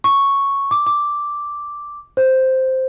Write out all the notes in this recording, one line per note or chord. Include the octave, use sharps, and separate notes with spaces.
C#6
D6
D6
C5